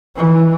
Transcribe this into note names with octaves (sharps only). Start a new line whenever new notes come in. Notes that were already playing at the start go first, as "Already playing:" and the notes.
E3